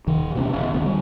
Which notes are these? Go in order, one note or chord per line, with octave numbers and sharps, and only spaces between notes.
D#1 D#3
B2 D3 B3 C#4
E1
D3 D#3 B3
D3 G3